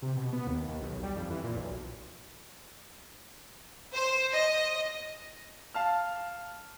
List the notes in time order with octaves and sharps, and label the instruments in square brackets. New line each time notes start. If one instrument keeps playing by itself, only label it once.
[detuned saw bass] C3
B2
B3
D#2
D#2
B1
G3
F2
E3
A#2
B1
[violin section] C5
D#5
[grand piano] F5 A5 F6